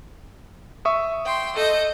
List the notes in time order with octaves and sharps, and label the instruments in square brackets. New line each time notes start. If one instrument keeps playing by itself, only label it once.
[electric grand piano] E5 C#6 D#6
[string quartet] G5 C6
A4 D#5 G6